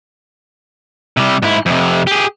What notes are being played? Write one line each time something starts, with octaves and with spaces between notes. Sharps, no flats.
C3 G3
G#2 E4
F2 C3
G4 G#4